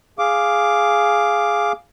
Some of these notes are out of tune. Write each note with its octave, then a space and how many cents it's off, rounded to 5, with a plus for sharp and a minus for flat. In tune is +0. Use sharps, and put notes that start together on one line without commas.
G#4 +0 F5 +0 D6 +0